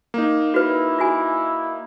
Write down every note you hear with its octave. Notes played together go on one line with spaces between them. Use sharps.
A#3 D#4
E4 F#4 B4
F4 F#4 G#5